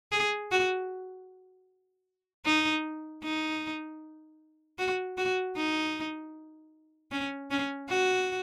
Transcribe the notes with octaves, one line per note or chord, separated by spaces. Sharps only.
G#4
F#4
D#4
D#4
F#4
F#4
D#4
C#4
C#4
F#4